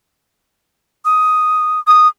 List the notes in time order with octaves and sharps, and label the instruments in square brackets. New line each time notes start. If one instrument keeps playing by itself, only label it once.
[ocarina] D#6
[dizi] D#6